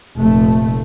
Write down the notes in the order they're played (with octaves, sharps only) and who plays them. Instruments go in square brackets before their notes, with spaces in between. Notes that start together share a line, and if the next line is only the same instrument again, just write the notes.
[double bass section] F1 A#2 A3